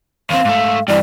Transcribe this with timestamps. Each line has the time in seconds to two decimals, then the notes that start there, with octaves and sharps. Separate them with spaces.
0.30 D#2 C4 F5
0.45 G#2 A3
0.88 G2 E3 D5